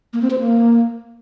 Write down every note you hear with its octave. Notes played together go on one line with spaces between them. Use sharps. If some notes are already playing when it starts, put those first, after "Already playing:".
A#3
C4
C5
A#3